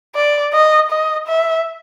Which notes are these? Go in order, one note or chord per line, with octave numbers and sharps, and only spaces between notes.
D5
D#5
D#5
E5